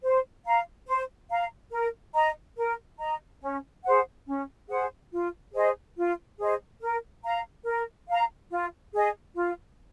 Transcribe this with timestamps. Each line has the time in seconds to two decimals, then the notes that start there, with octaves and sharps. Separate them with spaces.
0.03 C5
0.45 F5 A#5
0.87 C5
1.30 F5 A#5
1.72 A#4
2.14 D#5 A#5
2.57 A#4
2.99 D#5 A#5
3.42 C#4
3.85 G#4 C5 F#5
4.27 C#4
4.69 G#4 C5 F#5
5.12 F4
5.54 G#4 C5 D#5
5.97 F4
6.39 G#4 C5 D#5
6.81 A#4
7.24 F5 A#5
7.66 A#4
8.08 F5 A#5
8.51 F4
8.94 G#4 D#5
9.35 F4